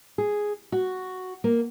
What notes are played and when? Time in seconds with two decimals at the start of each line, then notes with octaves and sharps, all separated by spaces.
0.18 G#4
0.72 F#4
1.44 A#3